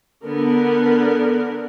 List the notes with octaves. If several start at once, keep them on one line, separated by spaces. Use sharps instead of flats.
D3 B3 A#4